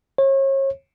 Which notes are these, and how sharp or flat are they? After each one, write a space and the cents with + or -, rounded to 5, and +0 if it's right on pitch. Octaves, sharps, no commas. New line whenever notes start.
C#5 -35